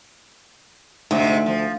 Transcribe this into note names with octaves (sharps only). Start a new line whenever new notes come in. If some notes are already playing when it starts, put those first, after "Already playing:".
D2 G#2 C3
F3